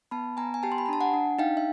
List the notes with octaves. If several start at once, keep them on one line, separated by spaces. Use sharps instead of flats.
B3 A5 B5
B3 G#5 A#5
G#5
G4 G5 A5
C6
B5
A#5
D4 A5
F#5 G#5
D4
D#4 F5 G5
E5